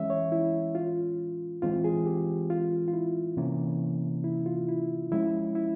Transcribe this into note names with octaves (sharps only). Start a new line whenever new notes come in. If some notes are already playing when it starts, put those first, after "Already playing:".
Already playing: E3 G#3 C#4 E5
C#5
E4
F4
E3 G#3 C4 F4
G#4
G4
F4
F4
E4
C3 E3 A#3 C#4
E4
F4
E4
F3 G#3 C#4 E4
E4